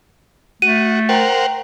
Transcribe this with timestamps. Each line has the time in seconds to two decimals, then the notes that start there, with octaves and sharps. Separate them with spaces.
0.62 A3 F#4 D#7
1.09 A#4 C5 F#5 G5 A#5